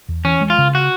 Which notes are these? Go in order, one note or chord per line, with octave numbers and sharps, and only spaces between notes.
E2
E3 C#4
G#3
F4
C#3
F#4